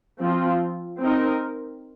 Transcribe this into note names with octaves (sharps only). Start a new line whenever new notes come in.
F3 C4 F4
C4 D#4 A#4